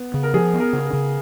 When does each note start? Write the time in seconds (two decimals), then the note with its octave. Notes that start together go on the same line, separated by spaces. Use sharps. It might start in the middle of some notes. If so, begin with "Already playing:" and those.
Already playing: B3
0.14 C#3
0.23 A#4
0.34 F3 G#4
0.53 B3
0.60 A#4
0.73 C#3
0.86 A#4
0.93 C#3